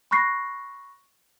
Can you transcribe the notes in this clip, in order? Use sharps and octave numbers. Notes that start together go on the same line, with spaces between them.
B5 C#6 F#6 A#6 C7